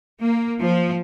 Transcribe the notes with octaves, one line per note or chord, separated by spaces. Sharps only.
A#3
F3